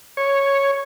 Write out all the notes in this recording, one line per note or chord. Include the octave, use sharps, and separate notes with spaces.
C#5